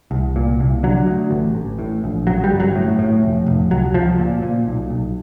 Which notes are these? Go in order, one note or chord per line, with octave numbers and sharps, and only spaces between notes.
C2
A#2
C2
D3 F#3
D2
A1
A1
A2
A#1
C#3 F#3
G3
G1
F#3
A2
A2
F1
F1
C#2 F#3
C#2 F3
A#2
A#2
B1
B1